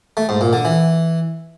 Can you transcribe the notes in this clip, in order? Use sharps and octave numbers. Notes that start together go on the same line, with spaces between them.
A3
G#2
A#2
D3
E3